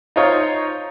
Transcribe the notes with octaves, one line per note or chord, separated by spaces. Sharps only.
D#4 F4 C5 C#5 D#5